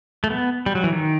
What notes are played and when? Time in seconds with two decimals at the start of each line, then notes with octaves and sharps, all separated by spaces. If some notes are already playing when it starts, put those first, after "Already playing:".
0.24 A3
0.30 B3
0.66 G3
0.75 F#3
0.84 E3
0.92 D#3